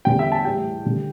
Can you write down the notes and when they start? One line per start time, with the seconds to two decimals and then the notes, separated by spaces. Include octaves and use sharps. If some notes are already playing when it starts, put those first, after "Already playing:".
0.05 E2 D3 G3 G5
0.19 E5
0.32 A5
0.45 A2 E3 G3 G5
0.85 D3 G3